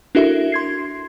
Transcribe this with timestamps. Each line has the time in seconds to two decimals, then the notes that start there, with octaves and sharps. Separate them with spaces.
0.15 D4 E4 F#4 A4 A#4 E5
0.52 C6 G#6 C7